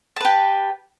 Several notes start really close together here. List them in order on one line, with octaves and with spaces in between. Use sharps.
A5 B4 G4